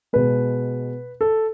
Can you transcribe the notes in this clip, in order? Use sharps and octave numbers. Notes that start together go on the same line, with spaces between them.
B2 G#3 B4
A4